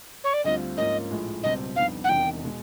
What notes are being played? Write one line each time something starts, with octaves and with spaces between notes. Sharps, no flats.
C#5
D5
D2 D3 G3 C4 F4 D#5
G#2 F3 A#3 C#4 D#5
A#1 A2 F3 G#3
C#2 B2 G3 C4 D#5
F2 D3 G3 B3 D#4 F5
F#5
E1 E2 C3 D#3 G5
B2 G#3